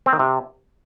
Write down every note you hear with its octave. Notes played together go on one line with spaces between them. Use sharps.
C4
D#3
C3